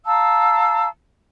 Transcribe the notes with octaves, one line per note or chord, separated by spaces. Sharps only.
F5 A5 A#5 E6